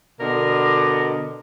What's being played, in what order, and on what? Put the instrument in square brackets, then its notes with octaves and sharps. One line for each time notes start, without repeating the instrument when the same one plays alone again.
[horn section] B2 D3 A#4 D5 D#5